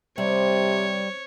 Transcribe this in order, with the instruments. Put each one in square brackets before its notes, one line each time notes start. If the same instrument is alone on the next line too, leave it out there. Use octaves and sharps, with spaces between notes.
[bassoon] C3 [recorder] G3 [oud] C4 [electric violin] C#5